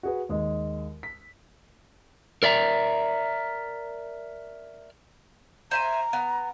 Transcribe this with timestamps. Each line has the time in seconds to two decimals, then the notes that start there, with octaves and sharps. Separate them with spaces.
0.03 F#4 G#4 B4
0.29 D#2 G#3 D#5
1.03 B6
2.43 A#4 D5 E5 A#5
5.71 C5 E5 G#5 A#5
6.13 B3